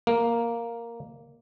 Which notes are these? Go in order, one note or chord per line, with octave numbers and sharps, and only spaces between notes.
A#3